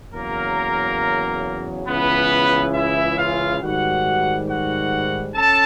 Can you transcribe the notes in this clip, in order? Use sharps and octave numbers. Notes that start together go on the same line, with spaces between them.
E2 C#3 F#3 A#3 A#4
C#2 C#3 E3 B3 B4
E4 E5
F4 F5
G#2 D#3 G3 F#4 F#5
F#4 F#5
C#4 A4 A5